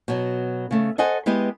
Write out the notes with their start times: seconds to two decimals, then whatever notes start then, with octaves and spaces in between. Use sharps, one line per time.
0.08 B2 F#3
0.71 C#3 A3
0.98 A4 C5 D#5 F#5 G#5
1.26 G#3 B3 E4 G4 B4 D#5